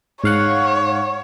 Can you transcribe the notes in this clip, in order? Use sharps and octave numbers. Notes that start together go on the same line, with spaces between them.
G#2 C#5 F5 F#5